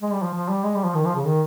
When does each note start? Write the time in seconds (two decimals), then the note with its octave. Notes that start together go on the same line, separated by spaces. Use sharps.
0.02 G#3
0.13 G3
0.23 F3
0.34 F3
0.49 G3
0.64 G#3
0.75 G3
0.85 F3
0.95 D#3
1.05 F3
1.16 C#3
1.26 D#3